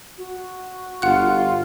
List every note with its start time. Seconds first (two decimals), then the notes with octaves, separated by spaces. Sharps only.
0.18 F#4
1.02 G1 F4 F#5 F#6